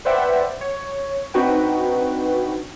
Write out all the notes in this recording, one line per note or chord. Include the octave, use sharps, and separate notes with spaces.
B4 C5 D5 E5 F#5 G5
C#5
C4 D4 D#4 F#4 B4 G5